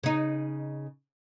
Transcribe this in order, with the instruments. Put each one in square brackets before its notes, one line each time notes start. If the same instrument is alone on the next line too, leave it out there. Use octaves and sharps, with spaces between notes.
[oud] C#3 D#4